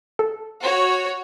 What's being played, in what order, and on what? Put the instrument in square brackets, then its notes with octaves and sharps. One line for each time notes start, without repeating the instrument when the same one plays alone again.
[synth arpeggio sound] A4
[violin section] F#4 C#5